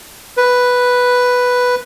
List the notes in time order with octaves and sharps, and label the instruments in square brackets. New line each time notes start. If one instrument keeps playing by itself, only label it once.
[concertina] B4